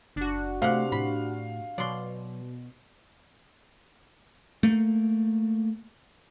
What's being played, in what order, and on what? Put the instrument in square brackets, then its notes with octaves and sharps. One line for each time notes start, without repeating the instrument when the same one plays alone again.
[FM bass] F#1 [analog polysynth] D4 F#4
[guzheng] C3 F#5 [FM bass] A3 [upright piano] F5
[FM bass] A2 [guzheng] B5
[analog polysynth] B2 [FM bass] F#3 [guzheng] D5 C6
[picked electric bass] A3 A#3